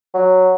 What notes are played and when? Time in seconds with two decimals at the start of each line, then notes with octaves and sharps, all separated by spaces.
0.14 F#3